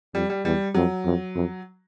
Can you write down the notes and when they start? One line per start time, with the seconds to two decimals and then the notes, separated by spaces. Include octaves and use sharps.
0.14 F2 G3
0.30 G3
0.45 E2 G3
0.75 F2 F#3
1.05 F2
1.35 F2